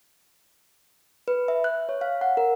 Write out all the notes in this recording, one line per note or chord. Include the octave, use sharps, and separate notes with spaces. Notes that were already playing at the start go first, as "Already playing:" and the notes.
B4
E5
F#6
C#5
F5
F#5
A#4